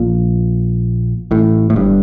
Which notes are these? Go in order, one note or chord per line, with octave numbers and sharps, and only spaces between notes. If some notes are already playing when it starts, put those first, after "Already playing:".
Already playing: A#1 A#2
A1 A2
A2
G1 G2